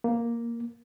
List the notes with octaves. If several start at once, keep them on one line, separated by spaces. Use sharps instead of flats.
A#3